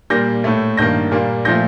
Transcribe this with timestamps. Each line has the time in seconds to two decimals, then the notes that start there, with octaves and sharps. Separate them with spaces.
0.10 A#2 G3 A#3 G6 A#6
0.44 A2 A3
0.77 G2 D#3 A#3 G6 A#6
1.11 A#2 G3 A#3
1.45 A#2 F3 A3 G6 A#6